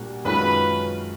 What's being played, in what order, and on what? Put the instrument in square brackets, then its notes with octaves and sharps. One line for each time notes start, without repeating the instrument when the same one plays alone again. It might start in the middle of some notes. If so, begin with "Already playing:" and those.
Already playing: [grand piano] A#2 G3 A#3 D4 F#4
[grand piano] F#2 D#3 G#3 C#4 F4 [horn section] B4